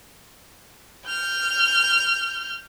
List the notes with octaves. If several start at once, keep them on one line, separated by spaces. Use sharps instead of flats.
F6 G6